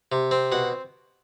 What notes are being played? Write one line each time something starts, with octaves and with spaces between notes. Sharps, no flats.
C3
C4
B2 F#5